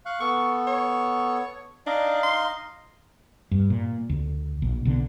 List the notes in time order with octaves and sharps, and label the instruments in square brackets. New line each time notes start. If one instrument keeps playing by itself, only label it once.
[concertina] F5 C#6 F#6
[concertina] B3 A4 [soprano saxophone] C#6
[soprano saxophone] C#5
[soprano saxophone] D4 [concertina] D#4 D#5 F5
[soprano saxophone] C6
[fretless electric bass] G2
A#2
D2
A#1
B1 D3